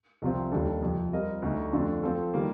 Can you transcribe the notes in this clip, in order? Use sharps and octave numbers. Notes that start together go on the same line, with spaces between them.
C2 C3 F3 C4 F4
D#2 D#3 G3 D4 A4
F2 C3 F3
G3 C4 F4 A#4 D#5
D2 D3 A3 D#4
F2 D3 A3 D4 F4
F3 C4 F4 A4
D#3 G3 A#3